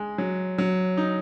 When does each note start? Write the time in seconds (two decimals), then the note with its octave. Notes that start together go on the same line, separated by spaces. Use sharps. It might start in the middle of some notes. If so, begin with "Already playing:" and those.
Already playing: G#3
0.18 F#3
0.58 F#3
0.97 D#4